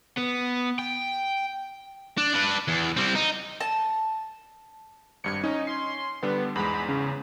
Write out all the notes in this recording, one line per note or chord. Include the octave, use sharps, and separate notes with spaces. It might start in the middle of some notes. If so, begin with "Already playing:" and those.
B3
G5
D4
D4 B4
E2
G3 C4
D#4
A5
G#1 G2 G#6 C#7
C#4 D#4
C6
D3 G3 B3 D4
E2 G#2 G#3 B5
C#3